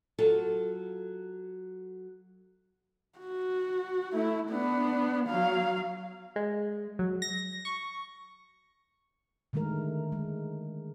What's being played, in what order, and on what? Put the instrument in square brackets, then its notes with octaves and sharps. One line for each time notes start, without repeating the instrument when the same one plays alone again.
[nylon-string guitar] F#3 F4 A4
[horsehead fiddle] F#4
A3 E4
B3 D4
F#3 F5
[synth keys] G#3
F#3
A#6
C#6
[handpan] D3 D#3 G#3 A3 A#4
G#3